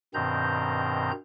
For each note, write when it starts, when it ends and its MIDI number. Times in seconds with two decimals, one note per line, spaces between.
0.14 1.11 43
0.14 1.11 47
0.14 1.11 51
0.14 1.11 60
0.14 1.11 82
0.14 1.11 91